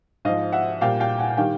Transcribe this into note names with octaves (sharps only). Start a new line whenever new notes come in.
G#2 F3 D#5 F5
E5 F#5
A#2 G3 F5 G5
F5 G5
F#5 G#5
D#3 G3 F5 G5